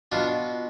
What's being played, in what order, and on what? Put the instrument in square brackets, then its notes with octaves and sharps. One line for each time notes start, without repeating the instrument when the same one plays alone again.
[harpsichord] B2 D4 F4